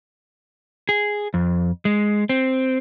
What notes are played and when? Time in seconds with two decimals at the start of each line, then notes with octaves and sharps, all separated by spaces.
0.89 G#4
1.34 F2
1.85 G#3
2.29 C4